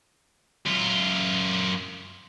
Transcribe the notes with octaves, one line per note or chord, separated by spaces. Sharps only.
F#2 F4